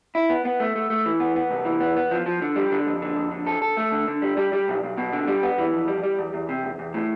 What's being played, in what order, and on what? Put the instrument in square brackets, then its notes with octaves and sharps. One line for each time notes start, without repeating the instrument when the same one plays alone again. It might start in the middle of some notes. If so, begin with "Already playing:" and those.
[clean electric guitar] E4
B3
B3
A3
A3
A3
E3
B3
B3
C2
E3
B3
B3
F3
F3
D3
G3
D3
F2
D3
F2
D3
A4
A4
A3
D3
D3
G3
G3
G3
B1
B1
B2
D3
G3
B3
E3
F2
G3
G3
E2
E2
C3
E2
E2
A2